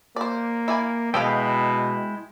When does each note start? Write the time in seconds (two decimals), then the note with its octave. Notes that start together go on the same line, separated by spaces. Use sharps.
0.16 A#3 C5 D5
0.68 E4 D5 G#5
1.14 B2 G#3 E4 A4 D#5 F5 G5